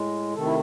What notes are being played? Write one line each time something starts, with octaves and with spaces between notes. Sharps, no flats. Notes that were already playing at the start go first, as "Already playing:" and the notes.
Already playing: A2 G#3
C3 D#3 A3 A4
E4